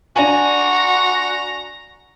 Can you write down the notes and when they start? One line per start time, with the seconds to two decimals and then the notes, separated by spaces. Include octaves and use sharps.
0.16 D4 F#4 G#5 A#5